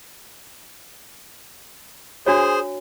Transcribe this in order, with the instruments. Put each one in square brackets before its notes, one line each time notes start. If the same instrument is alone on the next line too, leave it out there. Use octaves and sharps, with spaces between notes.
[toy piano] D4 F#4 C#5 [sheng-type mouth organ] G#4 C5